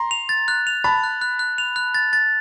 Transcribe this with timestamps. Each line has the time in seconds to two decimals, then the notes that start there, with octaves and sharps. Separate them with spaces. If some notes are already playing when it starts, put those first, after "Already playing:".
Already playing: A#5 C6
0.11 F7
0.29 A6
0.48 F#6
0.67 F7
0.84 A5 B5 A6
1.04 F#6
1.21 F#6
1.39 F#6
1.58 F7
1.76 F#6
1.94 A6
2.13 A6